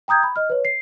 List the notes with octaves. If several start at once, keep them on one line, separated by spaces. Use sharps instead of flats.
G5 A#5 D#6 G6 G#6
B5
D#5 F6
B4 C#5
C7